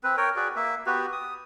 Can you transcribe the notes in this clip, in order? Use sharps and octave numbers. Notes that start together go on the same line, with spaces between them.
C4 B4
A#4 C#5 G5
F#4 G#4 B4 D5
A#3 E5
B3 F#4 G4 B4
D#6